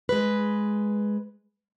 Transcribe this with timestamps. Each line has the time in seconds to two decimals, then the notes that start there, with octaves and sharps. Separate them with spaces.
0.09 G#3 B4